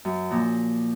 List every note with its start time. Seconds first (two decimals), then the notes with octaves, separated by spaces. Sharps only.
0.05 F#2
0.30 A#2 F3